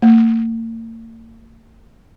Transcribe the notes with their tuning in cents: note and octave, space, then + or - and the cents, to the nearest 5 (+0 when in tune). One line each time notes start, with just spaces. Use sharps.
A#3 -45